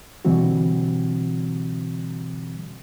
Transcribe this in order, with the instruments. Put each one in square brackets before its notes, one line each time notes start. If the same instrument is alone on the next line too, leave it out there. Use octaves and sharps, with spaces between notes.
[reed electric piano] B2 D3 E3 G3 C4 F#4